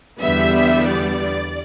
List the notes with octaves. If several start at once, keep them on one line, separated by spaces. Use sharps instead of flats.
E2 D3 G3 B3 E5
D5